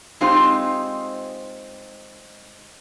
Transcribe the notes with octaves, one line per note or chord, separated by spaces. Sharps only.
G#3 C4 D#4 F4 G4 C5